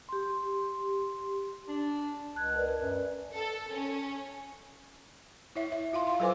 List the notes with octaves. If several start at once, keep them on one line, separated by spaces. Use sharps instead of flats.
G4 C6
D4
C#2 A5 F#6 G#6
A#4 B4 D5
F#2
A4
C#4
E4 C#5 E5
E5
F4 F5 C6
F5 C6
F#3 A4 B4 C5 G#5 D6